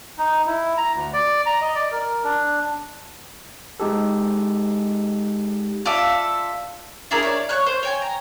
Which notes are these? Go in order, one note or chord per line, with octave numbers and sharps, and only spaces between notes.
D#4
E4
A#5
D2
D5
A#5
D#5
D5
A#4
D4
G#3 D#4 G4 A4
F4 A4 D5 E5
D4 E4 G#4 A#4
C#5 D5
C#5 C#6 F#6
C5
C#5 G5 G#5
A#5